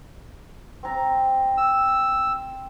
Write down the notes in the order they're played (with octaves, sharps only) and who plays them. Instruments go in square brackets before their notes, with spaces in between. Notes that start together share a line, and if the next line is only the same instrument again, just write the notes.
[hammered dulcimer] C4 A#5
[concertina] E6